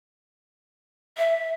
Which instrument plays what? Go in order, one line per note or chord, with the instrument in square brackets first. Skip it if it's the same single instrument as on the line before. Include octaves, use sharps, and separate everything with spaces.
[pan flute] E5